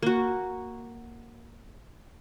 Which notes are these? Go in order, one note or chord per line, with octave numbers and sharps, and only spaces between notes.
A#3 F#4